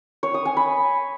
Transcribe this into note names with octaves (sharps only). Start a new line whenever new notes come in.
C#5
D#6
G#5
B5